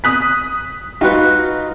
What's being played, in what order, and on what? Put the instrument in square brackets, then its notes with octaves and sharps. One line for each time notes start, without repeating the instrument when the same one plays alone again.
[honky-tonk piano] D#6 F#6 B6
[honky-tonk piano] D#4 [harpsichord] F4 F#4 B4